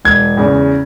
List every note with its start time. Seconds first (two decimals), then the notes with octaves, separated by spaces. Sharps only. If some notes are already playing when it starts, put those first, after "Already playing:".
0.05 E1 G#6
0.37 E2 C#3